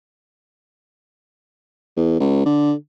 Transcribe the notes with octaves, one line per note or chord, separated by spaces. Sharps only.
E2
C#2
D3